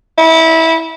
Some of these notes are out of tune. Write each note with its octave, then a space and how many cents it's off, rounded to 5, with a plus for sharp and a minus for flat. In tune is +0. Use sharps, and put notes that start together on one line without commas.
E4 -25